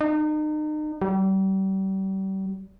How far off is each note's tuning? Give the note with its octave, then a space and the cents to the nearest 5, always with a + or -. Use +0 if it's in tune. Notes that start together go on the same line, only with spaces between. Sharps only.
D#4 -35
G3 -35